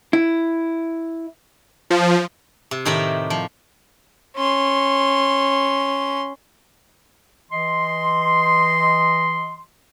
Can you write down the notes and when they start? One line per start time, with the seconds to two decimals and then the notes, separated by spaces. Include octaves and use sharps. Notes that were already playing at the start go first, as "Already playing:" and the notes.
0.13 E4
1.90 F3
2.71 C3
2.85 A2 D#3 E4 G4 A#4 E5
3.30 F3
4.36 C#4 C6
7.51 E3 D#5 C6